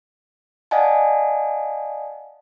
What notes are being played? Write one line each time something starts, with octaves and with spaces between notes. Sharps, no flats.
D5 D#5 F5 F#5 G#5 A5